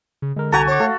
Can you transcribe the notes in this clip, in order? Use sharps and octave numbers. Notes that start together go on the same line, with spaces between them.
C#3
D3 G#3 A#4
C2 F#4 A4 G#5 A#5 G#6
C#5 C#6 D6
A3 A4 F5